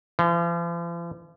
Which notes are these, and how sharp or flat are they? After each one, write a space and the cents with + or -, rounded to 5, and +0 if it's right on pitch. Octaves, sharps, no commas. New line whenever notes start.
F3 -45